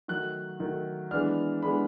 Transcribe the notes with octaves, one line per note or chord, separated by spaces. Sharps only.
D#3 F#3 A3 F#6
D#3 F#3 A3
E3 G#3 B3 D4 F6
E3 G#3 B3 D4 B5